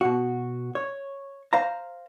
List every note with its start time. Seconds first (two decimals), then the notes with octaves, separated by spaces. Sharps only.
0.01 B2 F#4
0.75 C#5
1.53 C5 F5 A#5